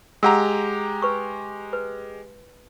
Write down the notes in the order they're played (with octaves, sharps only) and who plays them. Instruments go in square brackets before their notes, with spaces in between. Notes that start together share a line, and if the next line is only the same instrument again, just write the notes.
[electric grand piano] G#3 G4 A#5 [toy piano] F#5 E6
[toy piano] B4 C#6
B4